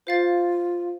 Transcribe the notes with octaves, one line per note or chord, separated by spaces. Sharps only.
F4 C5 F5 A6